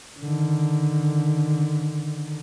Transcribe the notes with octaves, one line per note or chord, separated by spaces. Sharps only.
D3 D#3